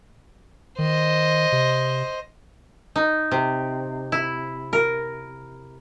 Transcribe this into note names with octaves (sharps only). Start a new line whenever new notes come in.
D#3 C5 D#5
C3
D#4
C3
E4
A#4